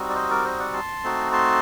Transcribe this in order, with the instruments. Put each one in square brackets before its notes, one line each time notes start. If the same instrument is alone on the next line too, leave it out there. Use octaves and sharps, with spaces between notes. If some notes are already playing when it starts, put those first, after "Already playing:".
Already playing: [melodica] G3 C4 D#4 F#4
D5
C5 D#5
A#4 D5
C5 D#5
D5 F#5
A5 C6
A3 C4 D#4 F#4
A5 C6